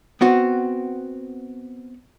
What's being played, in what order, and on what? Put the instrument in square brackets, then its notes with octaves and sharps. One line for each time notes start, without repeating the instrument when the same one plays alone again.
[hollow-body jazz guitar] B3 C4 F#4